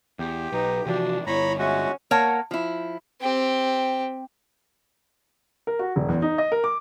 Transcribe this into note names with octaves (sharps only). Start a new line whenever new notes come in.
E2 G4
B1 D#4 B4
C3 E3 F3 D4 F#4
G1 E4 C#5 A#5 B5
G#3 C#4 F#4 E5
A#3 A#4 C#5 F#5 A5
F3 E4
C4 G4
A#4
F#4
E1
E2
D#4
D#5
A#4
D6